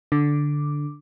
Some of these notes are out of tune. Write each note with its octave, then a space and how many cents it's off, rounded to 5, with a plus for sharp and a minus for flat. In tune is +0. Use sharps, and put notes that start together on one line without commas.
D3 +0 D6 +0